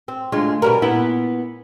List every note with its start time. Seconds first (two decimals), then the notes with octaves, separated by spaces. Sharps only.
0.08 C4
0.32 D2 G#3 F4
0.62 B2 G3 A#4
0.82 A#2 B3 E4